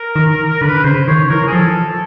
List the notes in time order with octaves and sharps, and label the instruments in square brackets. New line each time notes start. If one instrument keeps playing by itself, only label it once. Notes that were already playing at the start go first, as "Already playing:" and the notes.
Already playing: [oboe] A#4
[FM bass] D#3
[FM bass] D3 [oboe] B4
[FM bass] C#3 [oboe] C5
[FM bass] D#3 [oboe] C#5
[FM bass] E3 [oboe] A#4
[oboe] G#4
[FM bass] F3 [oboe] A4